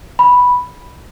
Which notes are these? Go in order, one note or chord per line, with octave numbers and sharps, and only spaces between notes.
B5